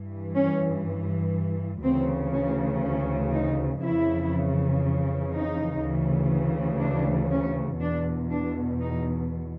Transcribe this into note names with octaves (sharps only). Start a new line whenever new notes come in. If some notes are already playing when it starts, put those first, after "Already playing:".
Already playing: G2 E3
C#4
D2 C#3 E3 C4
C#4
C#4
D#4
F2 C#3 E3 E4
D#4
D2 C#3 E3
D4
C#4
E2 B2 D4
D4
D#4